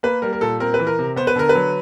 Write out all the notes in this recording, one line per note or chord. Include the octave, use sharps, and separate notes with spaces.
A#3 B4
G3 A#4
A#4
A#2 A4
C4 A#4
B4
E3
A#4
C3
B3 C5
B4
D3 A#4
B4
F#3